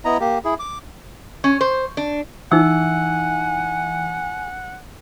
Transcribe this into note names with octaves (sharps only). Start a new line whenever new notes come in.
B3 E4 D#5 A#5
A#3 G4
E4 G#4
D6
C#4
C5
D4
E3 D#4 F#5 G#5 E6